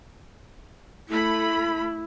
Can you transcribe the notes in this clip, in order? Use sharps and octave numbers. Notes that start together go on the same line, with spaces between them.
A3 E4 B5